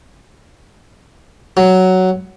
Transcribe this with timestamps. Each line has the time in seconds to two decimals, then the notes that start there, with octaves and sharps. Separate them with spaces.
1.57 F#3